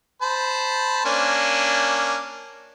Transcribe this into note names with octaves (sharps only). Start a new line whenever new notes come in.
C5 A5 B5
A#3 C#4 D4